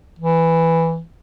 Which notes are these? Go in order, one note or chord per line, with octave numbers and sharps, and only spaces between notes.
E3